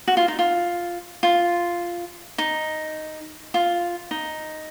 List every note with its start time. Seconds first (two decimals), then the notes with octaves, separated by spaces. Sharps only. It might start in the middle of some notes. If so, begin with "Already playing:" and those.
0.08 F#4
0.17 F4
0.28 D#4
0.39 F4
1.23 F4
2.38 D#4
3.54 F4
4.11 D#4